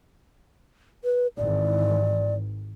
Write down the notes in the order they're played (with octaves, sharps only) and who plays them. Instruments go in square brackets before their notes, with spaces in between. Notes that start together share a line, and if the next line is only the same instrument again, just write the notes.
[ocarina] B4
[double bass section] G#1 E3 [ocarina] D5